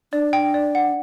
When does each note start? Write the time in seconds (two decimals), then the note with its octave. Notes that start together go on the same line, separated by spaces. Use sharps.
0.12 D4 D5
0.33 G5
0.54 D5
0.75 F#5